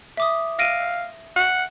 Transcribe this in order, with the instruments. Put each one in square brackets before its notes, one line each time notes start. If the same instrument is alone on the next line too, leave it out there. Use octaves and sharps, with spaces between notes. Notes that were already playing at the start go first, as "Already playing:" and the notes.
[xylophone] E5 D6 D#6
[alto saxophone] F5 [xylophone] A#6 D7 D#7
[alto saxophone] F#5